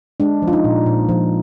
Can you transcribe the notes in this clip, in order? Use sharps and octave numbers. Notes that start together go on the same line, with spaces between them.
G#3 D4
F3
F4
D#4
A#2
A#2
F3